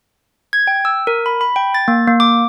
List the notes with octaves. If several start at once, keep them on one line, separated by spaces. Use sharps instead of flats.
G#6
G5
E6
A#4
B5
B5
G5
A6
A#3
A#3
D6